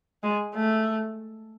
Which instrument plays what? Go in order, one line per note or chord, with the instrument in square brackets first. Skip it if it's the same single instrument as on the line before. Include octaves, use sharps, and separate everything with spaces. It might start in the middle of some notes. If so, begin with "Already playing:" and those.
[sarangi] G#3
A3